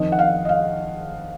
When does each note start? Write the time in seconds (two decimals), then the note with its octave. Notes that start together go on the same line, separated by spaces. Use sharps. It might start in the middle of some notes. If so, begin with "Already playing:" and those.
Already playing: F2 D#3 D#5
0.12 F#5
0.19 F5
0.45 D#5
0.49 F5